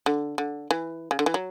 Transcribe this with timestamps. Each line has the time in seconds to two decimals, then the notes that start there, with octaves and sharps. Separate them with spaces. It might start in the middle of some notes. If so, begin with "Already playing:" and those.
0.06 D3
0.38 D3
0.71 E3
1.11 C#3
1.19 D3
1.26 E3
1.34 F#3